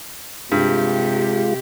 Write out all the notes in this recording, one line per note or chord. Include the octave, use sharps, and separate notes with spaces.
G2 C3 G#3 F4 G4